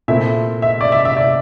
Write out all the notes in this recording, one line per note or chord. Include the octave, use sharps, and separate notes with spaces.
A#2 A3 C4 E4 E5
E5
D5
E5
E5
D5